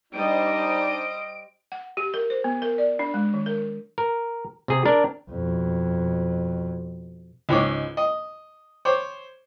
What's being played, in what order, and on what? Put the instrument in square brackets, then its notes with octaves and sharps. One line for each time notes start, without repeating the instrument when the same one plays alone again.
[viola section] G3 C5 D#5 [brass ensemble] D4 D#4 [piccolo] D7
[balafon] F#5
G4
A#4
C5
B3
A#4
D5
D4
G#3
D#3
A#4
[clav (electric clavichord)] A#4
C3 G#4
D4 A#4
[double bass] F2 B2
[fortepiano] C#2 G#2 C#5 D6
D#5
C5 C#5 D6